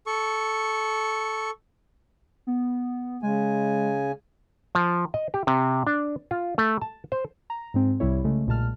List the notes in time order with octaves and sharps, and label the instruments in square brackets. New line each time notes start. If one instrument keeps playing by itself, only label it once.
[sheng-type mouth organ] A4 C#6
[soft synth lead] B3
[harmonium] C#3 G#5 [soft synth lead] G#3
[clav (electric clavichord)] F3
D#5
G4
C3
D4
F4
A3
A5
C5
[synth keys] A#5
G#2 G#3 C4
C2 C3 G3 E4 C#5
C#3 G#3 A3
B1 A#2 G#3 A5 F6